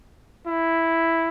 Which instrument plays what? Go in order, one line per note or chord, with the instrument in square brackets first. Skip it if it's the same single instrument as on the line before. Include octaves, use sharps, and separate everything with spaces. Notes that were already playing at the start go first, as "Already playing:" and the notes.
[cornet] E4